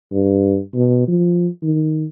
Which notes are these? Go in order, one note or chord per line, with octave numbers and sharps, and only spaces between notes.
G2
B2
F3
D#3